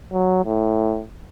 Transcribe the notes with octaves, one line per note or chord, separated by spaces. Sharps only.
F#3
A2